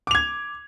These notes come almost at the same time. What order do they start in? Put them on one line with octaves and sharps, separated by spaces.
D6 F7 G#6